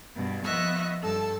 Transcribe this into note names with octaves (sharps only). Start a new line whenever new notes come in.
G2 B2
F3 B3 D#5 E5 C#6 F#6
G2 A4 A5 E6